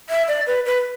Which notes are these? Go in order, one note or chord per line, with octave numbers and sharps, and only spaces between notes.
E5
D5
B4
B4